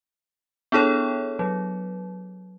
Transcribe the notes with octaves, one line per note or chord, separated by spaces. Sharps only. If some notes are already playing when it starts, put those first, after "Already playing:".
B3 D4 E4 G#4 A4 C#5
F#3